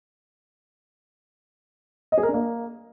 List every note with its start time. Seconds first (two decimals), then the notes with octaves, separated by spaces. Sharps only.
2.12 D#5
2.18 G#4
2.23 A#4
2.29 D4
2.34 A#3